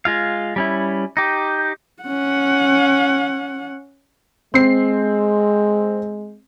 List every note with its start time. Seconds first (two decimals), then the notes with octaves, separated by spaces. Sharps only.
0.05 G#3 F4 F5
0.56 G3 C#4 E4
1.17 D#4 G4
2.03 C#4 F#5
4.54 G#3 C4 C7